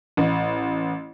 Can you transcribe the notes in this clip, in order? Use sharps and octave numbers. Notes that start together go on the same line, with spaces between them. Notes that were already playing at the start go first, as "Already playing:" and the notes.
A1